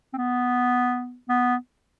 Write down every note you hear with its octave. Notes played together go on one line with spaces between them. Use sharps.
C4
B3
B3